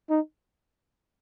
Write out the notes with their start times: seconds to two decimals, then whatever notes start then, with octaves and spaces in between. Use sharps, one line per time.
0.10 D#4